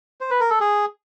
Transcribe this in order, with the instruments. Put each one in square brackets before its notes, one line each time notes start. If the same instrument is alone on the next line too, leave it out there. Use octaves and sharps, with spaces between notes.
[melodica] C5
B4
A#4
A4
G#4